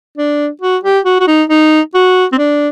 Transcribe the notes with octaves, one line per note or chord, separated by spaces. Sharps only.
D4
F#4
G4
F#4
F#4
D#4
D#4
F#4
C4
D4